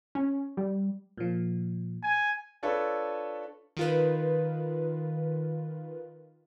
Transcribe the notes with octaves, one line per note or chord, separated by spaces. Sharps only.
C#4
G3
A#2 F3
G#5
D4 F4 A4 B4 C#5
D#3 F4 B4